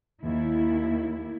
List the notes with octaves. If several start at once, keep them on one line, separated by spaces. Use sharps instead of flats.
D#2 E4